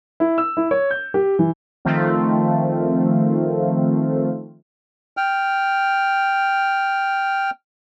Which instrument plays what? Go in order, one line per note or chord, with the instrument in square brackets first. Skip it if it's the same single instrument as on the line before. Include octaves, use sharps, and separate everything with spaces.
[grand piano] E4
E6
E4
C#5
G6
G4
E3
[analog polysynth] D#3 F3 A3 C4 F4
[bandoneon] G5 F6